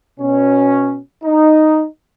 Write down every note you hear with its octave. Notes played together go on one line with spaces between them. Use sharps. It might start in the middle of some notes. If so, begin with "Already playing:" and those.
B2 C#4
D#4